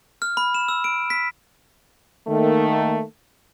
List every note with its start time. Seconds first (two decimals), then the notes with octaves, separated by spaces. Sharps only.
0.22 F6
0.37 B5
0.54 E7
0.68 E6
0.84 D7
1.10 B6
2.28 D#3 A3 A#3